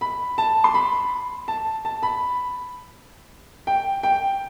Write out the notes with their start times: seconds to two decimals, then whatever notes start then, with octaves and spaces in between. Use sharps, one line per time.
0.01 B5
0.38 A5
0.64 C6
0.74 B5
1.48 A5
1.85 A5
2.03 B5
3.67 G5
4.03 G5